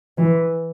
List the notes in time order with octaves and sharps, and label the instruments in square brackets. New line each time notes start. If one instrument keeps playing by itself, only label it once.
[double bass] E3